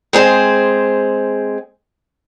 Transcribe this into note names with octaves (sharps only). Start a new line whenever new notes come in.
G#3 C4 G#4 C5